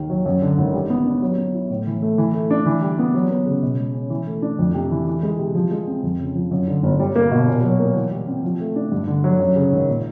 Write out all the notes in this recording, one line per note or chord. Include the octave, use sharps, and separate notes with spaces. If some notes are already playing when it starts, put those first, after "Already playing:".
Already playing: D#2 D#3
F#3
F#2
D3
G#1
G3
B3
D4
F#3
B3
E4
A2
E3
A3
E3
A3
D4
E3
G3
B3
F#3
B3
C#3
B2
G#3
C#4
E3
A3
D4
F2
C3
E3
E3
G#3
C3
F3
G#3
C4
F2
C#3
F3
F#2
D3
G1
G3
A#3
B2
A#2
F#3
A#3
E3
G3
C4
F3
A3
D4
G2
D3
F#3
F#2
C#3
G#1
A#2